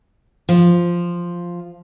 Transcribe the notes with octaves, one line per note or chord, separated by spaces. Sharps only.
F3